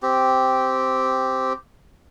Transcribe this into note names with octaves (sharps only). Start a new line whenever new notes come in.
C4 G4